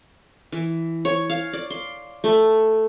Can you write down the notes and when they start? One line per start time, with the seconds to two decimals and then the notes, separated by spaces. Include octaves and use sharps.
0.52 E3
1.05 C#5
1.30 F5
1.53 D5
1.70 C6
2.24 A3